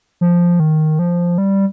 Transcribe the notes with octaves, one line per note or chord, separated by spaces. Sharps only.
F3
D#3
F3
G3